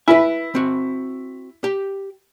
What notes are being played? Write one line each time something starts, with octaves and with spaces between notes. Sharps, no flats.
E4 B4 G#5
C4 F#4
G4